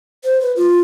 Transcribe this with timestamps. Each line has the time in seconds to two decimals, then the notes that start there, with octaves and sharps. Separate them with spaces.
0.24 C5
0.40 B4
0.56 F4